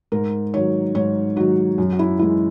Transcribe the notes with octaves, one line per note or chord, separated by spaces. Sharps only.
G#2 A#4
D#3 F#3 C#5
G#2 C#5
D#3 F#3 F#4
F#2
F#4
E4
E3 G#3 E4